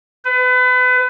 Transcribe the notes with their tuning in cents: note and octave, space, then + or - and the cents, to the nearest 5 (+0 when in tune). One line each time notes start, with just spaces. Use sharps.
B4 +30